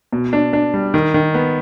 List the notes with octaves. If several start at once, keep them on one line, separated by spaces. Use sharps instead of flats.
B2
D4
D4
G3
D#3
D#3
B3